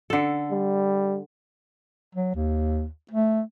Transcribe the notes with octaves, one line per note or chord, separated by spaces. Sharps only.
D3 A4
G3
F#3
D#2
A3